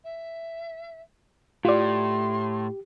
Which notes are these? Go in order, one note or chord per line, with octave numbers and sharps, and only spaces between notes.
E5
A2 F4 G4 D5 C6